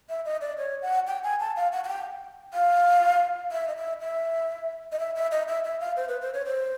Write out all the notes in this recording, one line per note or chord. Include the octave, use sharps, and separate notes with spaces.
E5
D#5
D5
C#5
F#5
G5
G#5
A5
F5
F#5
F#5
G5
F5
E5
D#5
E5
E5
D#5
E5
E5
D#5
E5
E5
F5
C5
B4
C5
C#5
C5